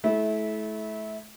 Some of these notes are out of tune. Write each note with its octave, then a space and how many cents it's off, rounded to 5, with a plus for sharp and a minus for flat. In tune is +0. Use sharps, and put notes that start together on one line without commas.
A3 -35 E4 -20